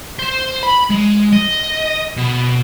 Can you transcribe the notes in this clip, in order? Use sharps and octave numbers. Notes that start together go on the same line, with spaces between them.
C5
B5
G#3
D#5
B2